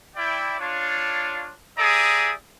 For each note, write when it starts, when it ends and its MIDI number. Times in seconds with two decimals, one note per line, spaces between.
0.17 0.56 64
0.17 0.56 74
0.17 0.56 79
0.59 1.52 62
0.59 1.52 65
0.59 1.52 73
1.78 2.33 67
1.78 2.33 68
1.78 2.33 74
1.78 2.33 76
1.78 2.33 82
1.78 2.33 87